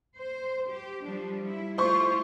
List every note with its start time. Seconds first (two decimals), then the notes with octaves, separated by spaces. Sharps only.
0.18 C5
0.69 G4
1.04 F3 G3 D4
1.46 E4
1.78 A3 E4 F4 C5 C6 C#6